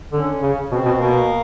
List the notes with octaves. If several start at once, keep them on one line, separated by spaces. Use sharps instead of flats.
D3 C#4
C#3
B2 C4
B2
B2 A#3